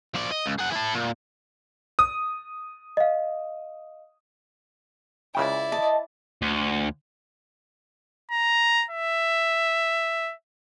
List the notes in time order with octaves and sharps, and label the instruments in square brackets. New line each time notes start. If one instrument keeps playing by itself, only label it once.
[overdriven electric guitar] F3 D5
D#5
C#2
G#4 F#5
E4 A4
A#2
[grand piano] D#6
[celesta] D#5 F5
[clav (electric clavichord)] C#2 C#3 G5 [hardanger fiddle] E4 D5
[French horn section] D#5 [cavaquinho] A5
[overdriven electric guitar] D2
[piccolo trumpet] A#5
E5